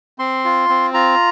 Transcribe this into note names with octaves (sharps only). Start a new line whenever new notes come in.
C4 C6
F4
C4
F4 A#5